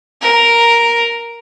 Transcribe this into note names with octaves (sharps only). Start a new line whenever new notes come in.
A#4